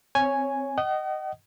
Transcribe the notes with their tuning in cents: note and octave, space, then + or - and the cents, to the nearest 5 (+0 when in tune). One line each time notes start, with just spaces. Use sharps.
C4 +0 C#5 +0 G#5 +0
D#5 -10 F#5 +45